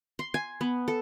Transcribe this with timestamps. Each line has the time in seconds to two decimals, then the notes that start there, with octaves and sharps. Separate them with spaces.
0.19 C6
0.34 G#5
0.61 B3
0.88 A4